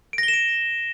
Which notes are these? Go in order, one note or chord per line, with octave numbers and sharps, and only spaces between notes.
D7
A#6
G7
E7
D7